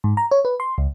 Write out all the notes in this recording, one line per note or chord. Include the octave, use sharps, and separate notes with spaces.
G#2
A#5
C#5
B4
C6
C#2